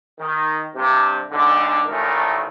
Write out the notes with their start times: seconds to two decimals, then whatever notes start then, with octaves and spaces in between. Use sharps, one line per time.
0.19 D#3
0.75 G2 C3
1.31 B1 G#2 D3
1.87 A1 A#2 D#3 A3 A#4